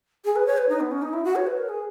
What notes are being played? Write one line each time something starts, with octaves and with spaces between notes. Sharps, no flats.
G#4
B4
C#5
B4
D#4
B3
C#4
D#4
E4
F#4
C#5
B4
A#4
G#4